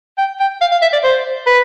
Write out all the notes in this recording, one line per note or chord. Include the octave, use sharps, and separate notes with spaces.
G5
G5
F5
F5
E5
D5
C5
B4